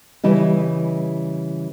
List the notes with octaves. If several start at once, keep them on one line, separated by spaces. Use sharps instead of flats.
C#3 E3 G3 E4 D#5